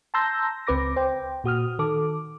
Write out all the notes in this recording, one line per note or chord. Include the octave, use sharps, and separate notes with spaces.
A5 A#5 C6 E6 G6 A#6
C#2 C4 B4 D6 A#6
C5 G5
A#2 F#4 D#6 F6
D#3 A4 D6